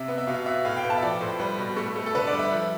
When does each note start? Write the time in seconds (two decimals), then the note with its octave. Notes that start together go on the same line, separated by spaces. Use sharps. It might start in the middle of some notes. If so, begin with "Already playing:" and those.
Already playing: C3 E5
0.08 B3
0.18 E5
0.27 B2 F5
0.46 B2 E5
0.65 A2 F5
0.77 G5
0.84 B3
0.90 A5
0.98 E5
1.02 F3 D5
1.21 A2 C5
1.40 G3 B4
1.58 B2
1.77 A3
1.96 A3
2.06 A4
2.15 D3 B4
2.27 D5
2.33 G3
2.39 E5
2.52 F3